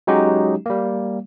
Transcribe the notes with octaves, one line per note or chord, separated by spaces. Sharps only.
F#3 G#3 C#4 D#4 F#4 G4
G3 A#3